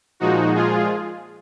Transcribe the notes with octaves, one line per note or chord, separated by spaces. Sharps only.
A#2 F3 G#3 D#4 F#4
F4 G#4